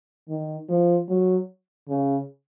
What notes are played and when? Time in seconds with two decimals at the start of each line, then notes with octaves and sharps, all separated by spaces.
0.29 D#3
0.69 F3
1.09 F#3
1.88 C#3